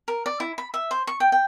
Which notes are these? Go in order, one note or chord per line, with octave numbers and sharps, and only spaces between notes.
A#4
D5
E4
B5
E5
C5
C#6
G5
G5